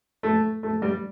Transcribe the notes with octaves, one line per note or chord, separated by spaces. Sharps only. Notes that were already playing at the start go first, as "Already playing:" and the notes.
A3
A3
G3